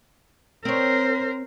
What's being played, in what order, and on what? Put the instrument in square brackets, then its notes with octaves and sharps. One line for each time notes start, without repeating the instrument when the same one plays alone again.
[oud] C4 C#5 [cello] A#4 C5